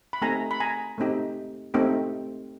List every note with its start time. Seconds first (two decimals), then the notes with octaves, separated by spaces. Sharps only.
0.13 B5
0.22 A3 C4 D#4 G4 G#5 A#5
0.51 B5
0.60 G#5 A#5
0.98 A3 C4 D#4 G4
1.74 A3 C4 D#4 G4